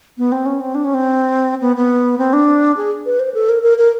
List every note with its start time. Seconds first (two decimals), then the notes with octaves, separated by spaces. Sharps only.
0.18 B3
0.32 C4
0.46 C#4
0.60 C4
0.75 D4
0.85 C#4
0.94 C4
1.61 B3
1.76 B3
2.19 C4
2.33 D4
2.77 G#4
3.06 B4
3.19 C5
3.34 A4
3.49 A#4
3.63 A#4
3.78 A#4